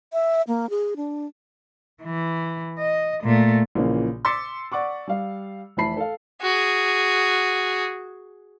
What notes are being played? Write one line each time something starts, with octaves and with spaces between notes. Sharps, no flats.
E5
A#3
G#4
D4
E3
D#5
A#2 A3
A#1 A#2 C#3 E3 A#3
C6 D6 E6 A6 B6 C#7
D5 F#5 C#6 D6
G3 F5
F1 E3 E4 A5 B5 C7
A4 F5
F#4 G#4